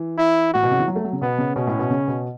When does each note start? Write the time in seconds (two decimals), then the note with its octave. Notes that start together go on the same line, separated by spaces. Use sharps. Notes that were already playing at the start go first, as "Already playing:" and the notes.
Already playing: E3
0.19 E4
0.53 A2 F#4
0.63 B2
0.71 C#3
0.79 E3
0.87 F#3
0.96 A3
1.04 F#3
1.13 C#3
1.21 B2 B3
1.38 C#3
1.56 B2 C#4
1.67 A2
1.79 B2
1.90 C#3
2.08 B2